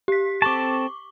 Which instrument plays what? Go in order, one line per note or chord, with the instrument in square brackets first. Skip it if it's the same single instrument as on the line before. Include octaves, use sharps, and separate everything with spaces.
[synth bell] G4 B6
[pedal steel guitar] C4 A4 A5 [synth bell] C#6 D6